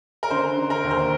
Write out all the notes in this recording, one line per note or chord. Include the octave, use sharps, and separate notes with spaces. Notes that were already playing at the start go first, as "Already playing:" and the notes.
A#4
D3 C5
D3
A#4
D#2
C5